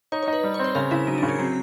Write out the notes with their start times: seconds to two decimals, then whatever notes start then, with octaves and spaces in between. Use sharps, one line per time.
0.12 D#4 C#5
0.23 C#5
0.28 D#4
0.33 B4
0.44 G3
0.54 C#5
0.59 C4
0.64 C5
0.75 C#3 A#4
0.91 C#3 E4
1.07 F#3 D#4
1.18 D4
1.23 C#3
1.28 C#4
1.39 F#3 C4